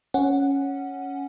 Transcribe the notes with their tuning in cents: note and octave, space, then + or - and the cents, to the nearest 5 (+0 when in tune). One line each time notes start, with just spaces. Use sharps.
C#4 +0 F#5 +0